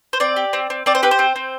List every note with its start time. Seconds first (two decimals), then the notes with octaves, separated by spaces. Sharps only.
0.13 C5
0.20 C4 D5
0.36 G4
0.53 C4
0.70 C4
0.86 C4 D5
0.95 C5
1.03 G4 B4
1.11 C5
1.19 C4
1.36 C4